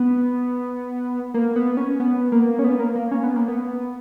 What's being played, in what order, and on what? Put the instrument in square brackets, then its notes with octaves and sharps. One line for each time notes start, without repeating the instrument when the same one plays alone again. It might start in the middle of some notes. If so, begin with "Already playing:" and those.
Already playing: [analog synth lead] B3
A#3
B3
C#4
B3
A#3
C#4
B3
A#3
A#3
C#4
B3
A#3
B3